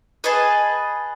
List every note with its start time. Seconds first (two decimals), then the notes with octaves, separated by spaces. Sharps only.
0.24 G#4 B4 D#5 A5